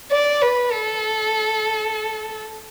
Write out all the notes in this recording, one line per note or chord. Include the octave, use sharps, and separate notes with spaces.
D5
B4
A4